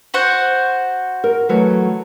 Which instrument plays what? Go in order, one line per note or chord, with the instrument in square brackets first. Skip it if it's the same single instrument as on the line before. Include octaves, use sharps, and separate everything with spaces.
[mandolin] F#4 C5 F#5
[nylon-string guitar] A#4
E3 F#3 A3